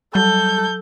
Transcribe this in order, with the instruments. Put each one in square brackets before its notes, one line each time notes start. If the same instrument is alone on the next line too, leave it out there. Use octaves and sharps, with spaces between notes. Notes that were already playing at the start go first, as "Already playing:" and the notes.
[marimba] F#3 [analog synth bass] G3 [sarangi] A4 [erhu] G6